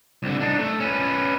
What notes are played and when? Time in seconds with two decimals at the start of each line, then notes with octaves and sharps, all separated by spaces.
0.23 C2 D3
0.40 D4 D#4
0.59 A3
0.80 C#4 B4